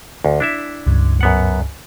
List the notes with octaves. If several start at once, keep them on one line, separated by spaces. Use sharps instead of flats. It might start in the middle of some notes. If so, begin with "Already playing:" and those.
D2
D4 E4 E5
C#2 G2
F#2 B3 F#5